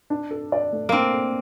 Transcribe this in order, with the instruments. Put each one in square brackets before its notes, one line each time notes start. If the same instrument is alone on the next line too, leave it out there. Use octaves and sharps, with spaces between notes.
[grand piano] D4
A4
D5
A3
[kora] A#3 C4 [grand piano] D4
[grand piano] A4